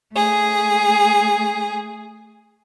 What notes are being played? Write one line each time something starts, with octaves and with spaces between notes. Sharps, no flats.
A3 G#4